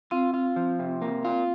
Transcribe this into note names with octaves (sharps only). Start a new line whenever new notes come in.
C4 F4
F4
F3
C3
A#3
F4